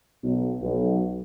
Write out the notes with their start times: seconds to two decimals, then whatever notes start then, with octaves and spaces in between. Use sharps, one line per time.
0.24 B1
0.62 B1